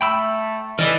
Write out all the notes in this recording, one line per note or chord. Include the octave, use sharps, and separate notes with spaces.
A3 G5 B5 E6
E3 A4 A#4 D5 D#5